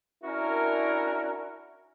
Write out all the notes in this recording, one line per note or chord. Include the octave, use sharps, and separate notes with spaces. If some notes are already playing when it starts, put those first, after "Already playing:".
C#4 D4 E4 F#4 A#4